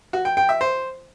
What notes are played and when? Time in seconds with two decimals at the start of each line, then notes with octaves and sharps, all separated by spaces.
0.13 F#4
0.25 G5
0.37 G5
0.49 E5
0.61 C5